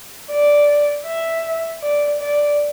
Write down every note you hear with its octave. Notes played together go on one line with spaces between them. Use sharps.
D5
E5
D5
D5